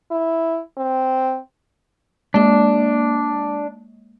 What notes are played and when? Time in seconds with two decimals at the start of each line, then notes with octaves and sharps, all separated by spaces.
0.11 E4
0.78 C4
2.34 G#3 A#3 D4